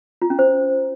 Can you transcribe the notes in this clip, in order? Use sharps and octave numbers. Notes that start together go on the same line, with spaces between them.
F4
C#4
C5